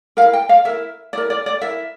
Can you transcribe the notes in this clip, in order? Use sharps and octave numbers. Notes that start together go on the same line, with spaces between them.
E4 A#4 F5
G5
F5
E4 A#4 E5
E4 A#4 D5
D5
D5
E4 A#4 E5